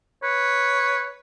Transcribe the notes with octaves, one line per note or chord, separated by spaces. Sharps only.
B4 C#5